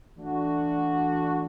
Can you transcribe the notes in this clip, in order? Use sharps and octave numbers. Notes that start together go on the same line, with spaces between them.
E3 A3 D4 F#4